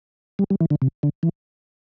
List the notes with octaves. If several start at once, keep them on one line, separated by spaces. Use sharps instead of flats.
G3
G3
E3
D3
C3
D3
E3